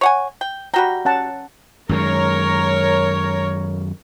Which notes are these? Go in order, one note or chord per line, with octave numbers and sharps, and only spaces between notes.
C#5 F#5 G#5
G5
G3 F#4 G5 A#5
C#4 F#5 A5
F#2 D#3 G#3 A#4 C#5